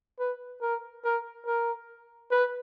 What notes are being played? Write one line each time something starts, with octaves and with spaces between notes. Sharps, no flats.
B4
A#4
A#4
A#4
B4